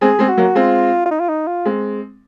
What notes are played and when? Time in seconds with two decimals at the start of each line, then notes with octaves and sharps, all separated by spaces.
0.01 G#3 C4 G#4
0.19 G#3 C4
0.28 F#4
0.37 F#3 A#3
0.55 G#3 C4 F4
1.06 F4
1.11 D#4
1.20 F4
1.29 D#4
1.47 F4
1.65 G#3 C4